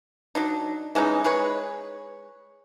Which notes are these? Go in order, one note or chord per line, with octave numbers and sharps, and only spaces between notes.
F#3 D4 D#4
E3 G#3 C#4 D#4
G#3 G#4 B4 C#5